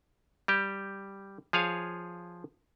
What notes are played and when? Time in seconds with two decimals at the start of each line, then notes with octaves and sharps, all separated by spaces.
0.48 G3 G4
1.53 F3 G#4 C#5 F5